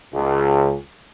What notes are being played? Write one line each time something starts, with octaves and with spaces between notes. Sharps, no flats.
C#2